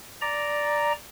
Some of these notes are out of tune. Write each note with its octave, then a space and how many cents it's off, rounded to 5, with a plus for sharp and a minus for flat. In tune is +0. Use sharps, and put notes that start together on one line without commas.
D5 +0 A#5 +0